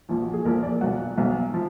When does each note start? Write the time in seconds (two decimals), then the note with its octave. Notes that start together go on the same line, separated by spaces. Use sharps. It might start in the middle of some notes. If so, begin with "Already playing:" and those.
0.09 A#1 A#2 F3
0.21 F#4
0.33 G#4
0.45 A#1 A#2 F3 A#4
0.63 D5
0.81 B1 B2 F#3 F#5
1.17 B1 B2 F#3
1.54 F3